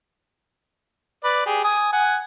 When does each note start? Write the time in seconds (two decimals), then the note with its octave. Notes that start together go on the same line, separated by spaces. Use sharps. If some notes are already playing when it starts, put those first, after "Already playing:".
1.24 B4 D5
1.46 G4 G#4
1.64 G#5 D#6
1.93 F#5 G#5